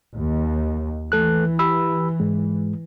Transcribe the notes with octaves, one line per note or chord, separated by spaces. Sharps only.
D#2
E3 A3 A4 F#6
G4 B5 E6
G#2 G#3